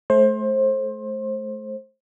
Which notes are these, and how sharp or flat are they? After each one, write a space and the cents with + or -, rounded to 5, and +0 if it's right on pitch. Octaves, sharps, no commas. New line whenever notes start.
A3 -30 C5 +25